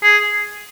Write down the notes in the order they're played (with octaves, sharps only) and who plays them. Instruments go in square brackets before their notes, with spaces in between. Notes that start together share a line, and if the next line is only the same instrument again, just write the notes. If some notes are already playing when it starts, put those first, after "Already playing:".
[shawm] G#4